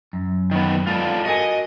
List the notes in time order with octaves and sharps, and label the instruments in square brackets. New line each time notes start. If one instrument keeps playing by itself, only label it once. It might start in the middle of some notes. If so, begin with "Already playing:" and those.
[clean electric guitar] F#2
[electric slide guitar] D#3 B3
[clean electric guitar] G#3 [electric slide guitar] F4 A4 D5
[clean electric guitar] F#4 A#4 G#5 [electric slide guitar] D#5